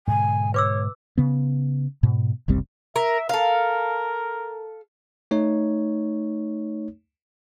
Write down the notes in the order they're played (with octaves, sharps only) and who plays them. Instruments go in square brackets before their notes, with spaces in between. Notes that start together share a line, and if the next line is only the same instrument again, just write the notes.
[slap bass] G#2 B2 D3 [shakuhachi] G#5
[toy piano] B4 D6 E6 [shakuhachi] C#5
[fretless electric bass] C#3 B3
G#2 B2
F#1 C2 G3 C4
[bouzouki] A#4 [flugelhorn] E5
[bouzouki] A4 F5 [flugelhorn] A#4
[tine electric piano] A3 D#4 C#5